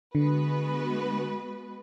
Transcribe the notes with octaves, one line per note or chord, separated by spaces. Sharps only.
D3 G#3 B3 F#4 B4